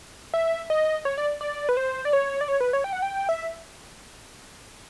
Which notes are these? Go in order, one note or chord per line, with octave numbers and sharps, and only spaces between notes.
E5
D#5
C#5
D5
D5
B4
C5
D5
C#5
D5
C#5
B4
C#5
G5
F#5
G5
E5